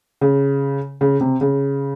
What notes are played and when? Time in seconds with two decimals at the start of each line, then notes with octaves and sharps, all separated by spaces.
0.21 C#3
1.01 C#3
1.21 C3
1.41 C#3